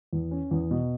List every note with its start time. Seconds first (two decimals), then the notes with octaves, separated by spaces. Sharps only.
0.13 E2
0.31 C#4
0.51 E2
0.71 B2